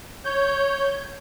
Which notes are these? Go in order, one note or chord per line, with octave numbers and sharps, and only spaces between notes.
C#5 G6